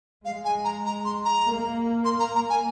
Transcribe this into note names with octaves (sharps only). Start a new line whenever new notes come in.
G#3 F5
G#5
A#5
A#5
C6
A#5
A#3
C6
A#5
A#5
G#5